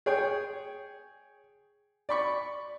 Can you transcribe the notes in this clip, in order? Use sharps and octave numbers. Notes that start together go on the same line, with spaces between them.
G#4 C#5 G5
D5 B5 C#6